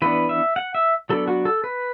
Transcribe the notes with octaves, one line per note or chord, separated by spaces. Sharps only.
E3 B3 D4 B4
E5
F#5
E5
F#3 B3 D4 A4
F#4
A4
B4